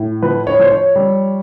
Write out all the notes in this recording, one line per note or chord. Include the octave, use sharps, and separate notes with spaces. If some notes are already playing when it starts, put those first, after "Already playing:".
Already playing: A2
F3 B4
C#5
F3 C5
C#5
G3